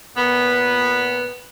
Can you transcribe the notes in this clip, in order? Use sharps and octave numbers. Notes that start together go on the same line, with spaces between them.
A#2 B3